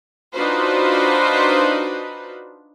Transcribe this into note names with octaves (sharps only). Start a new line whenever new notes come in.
D4 D#4 F4 F#4 B4 C5